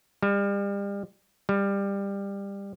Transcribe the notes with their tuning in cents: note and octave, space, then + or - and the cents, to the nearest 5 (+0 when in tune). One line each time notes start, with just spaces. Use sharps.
G3 +35
G3 +20